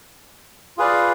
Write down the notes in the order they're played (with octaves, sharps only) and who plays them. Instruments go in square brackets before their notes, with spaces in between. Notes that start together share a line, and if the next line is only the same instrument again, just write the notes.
[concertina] F4 G#4 B4 D5 F5